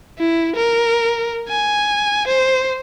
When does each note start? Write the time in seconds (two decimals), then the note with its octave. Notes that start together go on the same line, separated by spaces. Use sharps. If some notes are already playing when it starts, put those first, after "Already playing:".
0.19 E4
0.56 A#4
1.49 G#5
2.27 C5